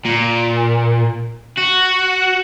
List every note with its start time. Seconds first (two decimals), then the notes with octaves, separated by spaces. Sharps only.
0.05 A#2
1.58 F#4